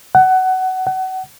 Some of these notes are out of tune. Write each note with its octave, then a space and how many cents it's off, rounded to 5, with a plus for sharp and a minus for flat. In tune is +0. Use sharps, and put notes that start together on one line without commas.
F#5 +20
F#5 +30